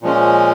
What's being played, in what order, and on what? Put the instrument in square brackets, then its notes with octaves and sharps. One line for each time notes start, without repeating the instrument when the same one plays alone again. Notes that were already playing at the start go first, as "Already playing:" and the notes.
[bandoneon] A#2 F3 G#3 C#4